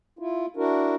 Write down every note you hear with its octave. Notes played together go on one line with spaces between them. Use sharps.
E4 F4
D4 E4 F#4 A#4